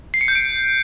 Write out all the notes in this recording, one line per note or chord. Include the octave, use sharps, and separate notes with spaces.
C7
C#7
G6
D7